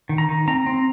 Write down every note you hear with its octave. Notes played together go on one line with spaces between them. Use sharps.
D#3
A#5
D#3
C4 A#5
C4